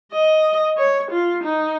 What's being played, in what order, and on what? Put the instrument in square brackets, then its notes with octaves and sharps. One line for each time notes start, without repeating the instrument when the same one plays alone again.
[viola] D#5
C#5
F4
D#4